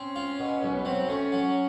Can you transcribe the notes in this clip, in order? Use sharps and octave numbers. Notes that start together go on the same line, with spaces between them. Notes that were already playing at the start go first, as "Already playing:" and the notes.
Already playing: C4 C#4
F4
B2
B1
B3
F#3 C4
A3 C#4
F#3